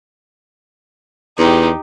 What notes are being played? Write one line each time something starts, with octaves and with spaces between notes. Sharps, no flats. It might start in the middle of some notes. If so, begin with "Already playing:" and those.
E2 D#4 G4